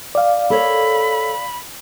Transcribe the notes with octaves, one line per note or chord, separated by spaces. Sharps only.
D5 F5
A4 A#4 C#5 B5